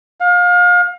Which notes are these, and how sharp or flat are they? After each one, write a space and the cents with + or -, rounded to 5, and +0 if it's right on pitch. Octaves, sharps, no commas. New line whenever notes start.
F5 +30